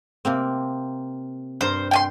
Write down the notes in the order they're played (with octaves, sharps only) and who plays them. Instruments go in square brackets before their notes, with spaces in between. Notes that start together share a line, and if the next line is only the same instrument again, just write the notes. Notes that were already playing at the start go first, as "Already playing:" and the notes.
[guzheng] C3 A#3 C4
[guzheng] G2 A#4 [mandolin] C5
[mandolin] G5 G#5 C6